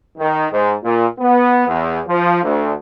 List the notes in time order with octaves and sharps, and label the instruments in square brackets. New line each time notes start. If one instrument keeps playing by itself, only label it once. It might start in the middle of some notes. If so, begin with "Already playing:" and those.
[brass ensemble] D#3
G#2
A#2
B3
E2
F3
D2